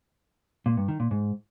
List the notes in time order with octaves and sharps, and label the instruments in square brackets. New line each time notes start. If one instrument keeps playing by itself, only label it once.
[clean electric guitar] A#2
G2
D#3
A#2
G#2